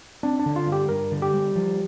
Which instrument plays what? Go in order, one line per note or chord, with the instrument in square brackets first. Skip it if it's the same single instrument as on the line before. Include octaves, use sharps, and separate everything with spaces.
[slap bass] C4 [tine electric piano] D4
[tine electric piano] D4
[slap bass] D3
[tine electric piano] F4
[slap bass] G2
[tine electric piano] G4
[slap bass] G2 [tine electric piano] A#4
[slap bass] D3
[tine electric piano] G4
[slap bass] G3
F3